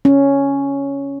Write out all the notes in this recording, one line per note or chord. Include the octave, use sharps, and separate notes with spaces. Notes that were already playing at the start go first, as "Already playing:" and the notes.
C#4